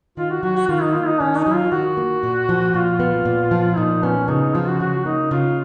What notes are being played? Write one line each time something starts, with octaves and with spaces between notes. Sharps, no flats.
D#3 F4
F#4
F#3 F#4
F#4
D#3 F4
D#4
A#3 F4
D#4
D#3 C#4
D#4
F#3
F4
D#3 F#4
A#3
A#2
F3
A#2 F4
B3
A#2
F3
A#2 D#4
B3 C#4
C#3 D#4
D#4
F3 F4
F#4
C#3 F#4
A#3 D#4
C#3 F4